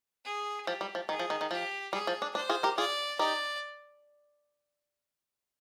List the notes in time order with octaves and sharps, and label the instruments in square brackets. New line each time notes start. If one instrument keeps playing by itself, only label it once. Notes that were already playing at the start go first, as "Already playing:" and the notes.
[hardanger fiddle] G#4
[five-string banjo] F3 [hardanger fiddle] G4
[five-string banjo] G3
F3
[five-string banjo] D#3 [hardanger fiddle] G#4
[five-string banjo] F3
D#3
D#3
[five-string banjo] F3 [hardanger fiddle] G4
[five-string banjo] G3 [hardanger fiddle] G#4
[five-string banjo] F3
D4
[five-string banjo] D4 [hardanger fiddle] C5
[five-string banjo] F4 G#4
G4 A#4
[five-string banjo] F4 G#4 [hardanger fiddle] D5
[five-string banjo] D#4 G4 [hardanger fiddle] D5